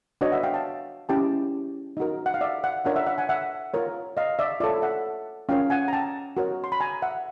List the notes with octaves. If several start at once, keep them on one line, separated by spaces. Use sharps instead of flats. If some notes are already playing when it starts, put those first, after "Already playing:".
D4 F#4 B4 C#5 D#5
E5 F#5
F5 G5
G5 A5
C#4 E4 G4 G5 A5
D#4 F#4 A#4
F#5
F5
D5 E5
E5 F#5
D4 F4 A#4 C#5 E5 F#5
E5 F#5
E5 F#5
F#5 G#5
E5 F#5
F4 A#4 C#5
D#5 F5
D5 E5
F4 A4 C#5 D5 E5
E5 F#5
C#4 F4 A#4 C#5 F5 G5
F#5 G#5
A#5
G5 A5
F#4 A#4 C#5
C6
B5
G#5 A#5
E5 F#5